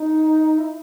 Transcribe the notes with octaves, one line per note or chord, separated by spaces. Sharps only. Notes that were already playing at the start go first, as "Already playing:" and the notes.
Already playing: D#4
E4